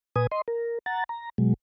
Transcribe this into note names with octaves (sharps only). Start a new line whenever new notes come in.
A#2 B4 G#5 D#6
D#5 C6
A#4
F#5 A#5 A6
A#5
B2 F#3 G#3